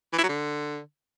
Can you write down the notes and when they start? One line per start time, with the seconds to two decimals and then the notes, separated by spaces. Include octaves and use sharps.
0.13 E3
0.18 E4
0.23 F#3
0.29 D3